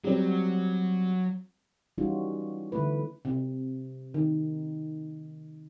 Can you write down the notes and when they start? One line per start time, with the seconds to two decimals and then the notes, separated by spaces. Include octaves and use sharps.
0.04 F#3 G3 C4
1.98 E3 G3 C#4 D#4 F4 F#4
2.72 D3 E3 A3 E4 B4
3.25 C3
4.14 D#3